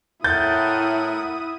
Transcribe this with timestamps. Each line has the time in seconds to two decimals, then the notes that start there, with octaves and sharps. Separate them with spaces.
0.24 A2 E4 A#4 F#5 D#6 G6 A6